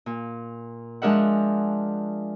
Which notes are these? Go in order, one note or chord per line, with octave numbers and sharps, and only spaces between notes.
A#2
F3 G#3 D4 A#4 E5 F#5